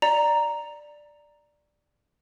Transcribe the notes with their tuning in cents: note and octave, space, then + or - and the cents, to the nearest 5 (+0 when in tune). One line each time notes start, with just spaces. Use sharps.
D5 +5 A#5 +0